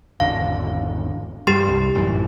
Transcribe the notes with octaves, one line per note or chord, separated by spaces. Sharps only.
G#1 E2 D3 F5
G2 G3 G4 C6
C2
A1 F#2 E3